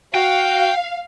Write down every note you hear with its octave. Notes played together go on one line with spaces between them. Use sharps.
F#4 F5 G5